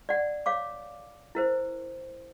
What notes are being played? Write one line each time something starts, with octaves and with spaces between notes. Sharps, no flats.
D5 F#5
C#5 F5 D6
E4 A#4 C5